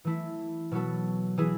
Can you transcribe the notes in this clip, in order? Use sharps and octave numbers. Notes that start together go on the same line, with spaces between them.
E3 A3 E4
B2 F#3 B3 F#4 A4
E3 B3 E4 G#4